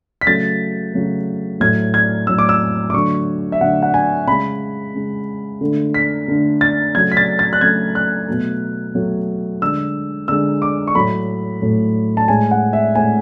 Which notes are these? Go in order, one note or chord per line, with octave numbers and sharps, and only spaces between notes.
B6
C#3 F#3 A3 A6
C#3 F#3 A3
A2 F#3 A3 G#6
G#6
A2 F#3 A3 E6
D6
E6
D6
D3 F#3 A3 C#6
E5
D3 F#3 A3 F#5
F#5
G#5
C#3 G#3 B5
C#3 G#3
D3 A3
B6
D3 A3
A6
C#3 F#3 A3 G#6
B6
A6
A6
F#6
C#3 F#3 A3 G#6
F#6
B2 F#3 A3
B2 F#3 A3
D3 G#3 E6
D3 G#3 E6
D6
C#6
A2 F#3 A3 B5
A2 F#3 A3
A5
A2 G#3 G#5
F#5
E5
A2 G#3 G#5